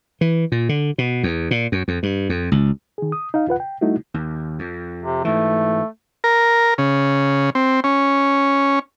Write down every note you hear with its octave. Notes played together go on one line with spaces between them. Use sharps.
E3
A#2
D3
B2
E2
A#2
F#2
F2
G2
F2
C#2
D#3 G#4
D#6
D#4 F5
E2 F4 B4 F#5
G5
G3 A3 D#4 E4 F#4
D#2
F2
C3
G#2 E3 A3
A#4
C#3
C4
C#4